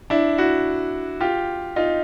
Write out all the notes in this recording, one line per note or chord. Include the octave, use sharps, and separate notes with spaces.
D4 E4
E4 F#4
F4 G4
D#4 F4